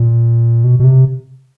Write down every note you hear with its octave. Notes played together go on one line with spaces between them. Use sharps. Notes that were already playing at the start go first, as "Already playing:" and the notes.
Already playing: A#2
B2
B2
C3